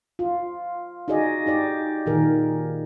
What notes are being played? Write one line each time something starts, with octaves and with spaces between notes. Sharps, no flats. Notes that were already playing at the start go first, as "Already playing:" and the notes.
F4
D#4 F#4 G#4 D5 D#5
D#4 G4 D5
A#2 D#3 G#4 A#4